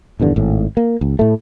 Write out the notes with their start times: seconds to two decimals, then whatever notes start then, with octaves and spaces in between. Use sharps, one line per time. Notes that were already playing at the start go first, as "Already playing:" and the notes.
0.20 D#1 E2 G2 D3
0.36 G#1 A2
0.77 A#3
1.01 C#2
1.19 A2 A3